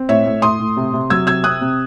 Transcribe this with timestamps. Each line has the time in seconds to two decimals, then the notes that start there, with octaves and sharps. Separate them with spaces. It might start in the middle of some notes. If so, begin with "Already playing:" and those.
Already playing: C4
0.09 A2 C#5 E5
0.26 A2
0.42 A2 C6 D#6
0.60 A2
0.77 C3
0.93 C3
1.10 F#3 E6 G#6
1.27 C3 E6 G#6
1.44 C4 D#6 F#6
1.61 C3